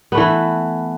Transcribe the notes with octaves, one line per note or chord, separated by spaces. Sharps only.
E3 A3 B3 E4